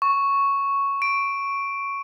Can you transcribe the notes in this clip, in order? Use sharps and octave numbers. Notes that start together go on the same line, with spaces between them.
C#6
D7